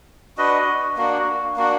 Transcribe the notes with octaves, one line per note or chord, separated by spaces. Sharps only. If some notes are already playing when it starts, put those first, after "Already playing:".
D4 F#4 B4 D#5
A#3 D4 F#4
A#3 D4 F#4